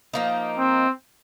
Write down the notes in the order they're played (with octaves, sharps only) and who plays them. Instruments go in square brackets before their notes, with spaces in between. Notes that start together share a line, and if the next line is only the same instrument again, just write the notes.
[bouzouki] F3 A#3 D#4
[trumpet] C4